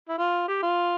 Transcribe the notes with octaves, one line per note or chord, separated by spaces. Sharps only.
E4
F4
G4
F4